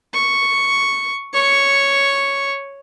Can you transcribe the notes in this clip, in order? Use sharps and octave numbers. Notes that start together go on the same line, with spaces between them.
C#6
C#5 C#6